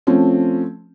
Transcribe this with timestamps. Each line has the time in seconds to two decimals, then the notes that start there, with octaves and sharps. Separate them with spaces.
0.07 F3 A3 C4 C#4